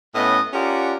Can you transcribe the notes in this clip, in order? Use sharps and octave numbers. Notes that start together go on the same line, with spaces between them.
A2 B3 C#4 D#5
C#4 F4 G4 A#4 D5 F#5